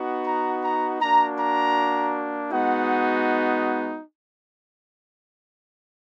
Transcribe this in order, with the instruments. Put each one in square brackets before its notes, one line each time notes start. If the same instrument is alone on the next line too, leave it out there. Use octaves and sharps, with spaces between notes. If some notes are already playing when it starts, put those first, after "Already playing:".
Already playing: [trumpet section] B3 D#4 F#4
A#5
A#5
A#3 D4 F#4 A#5
A#5
G#3 B3 D#4 F#4 F#5